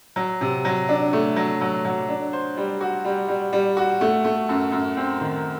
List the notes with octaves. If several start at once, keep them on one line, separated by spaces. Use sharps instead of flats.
F#3
C3
F#3
D4
A3
F#3
F#3
F#3
D4
C5
G3
F#4
G3
G3
G3
F#4
A3
A3
F#2
F#2
C4
D#3